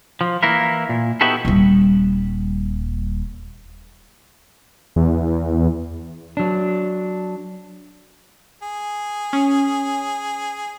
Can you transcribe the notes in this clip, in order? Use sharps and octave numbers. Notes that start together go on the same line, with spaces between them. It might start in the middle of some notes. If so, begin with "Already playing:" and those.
F3
E3 A#3 E4 A#4
A#2
B3 D#4 E4 F#4 G4 A4
D#1 G3
E2
F#3 D4
G#4
C#4